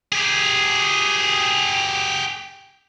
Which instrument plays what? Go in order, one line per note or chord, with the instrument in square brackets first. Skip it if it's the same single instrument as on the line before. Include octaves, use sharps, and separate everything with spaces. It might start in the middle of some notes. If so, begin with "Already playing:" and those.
[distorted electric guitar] G4 G#4